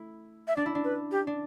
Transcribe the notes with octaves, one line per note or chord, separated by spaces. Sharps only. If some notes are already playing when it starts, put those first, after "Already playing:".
Already playing: A3 E4
E5
D4 D5
E4
D4
B4
G4
D4